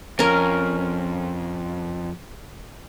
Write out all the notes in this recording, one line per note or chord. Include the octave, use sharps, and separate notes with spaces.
F2 C#4 A#4